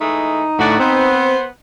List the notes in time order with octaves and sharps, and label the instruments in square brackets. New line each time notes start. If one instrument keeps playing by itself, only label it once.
[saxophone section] E3 G#3 A3 [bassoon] D#4
[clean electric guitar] A2 A3 D5 [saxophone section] D4 F#4
[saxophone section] B3 [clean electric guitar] C4 [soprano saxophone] C5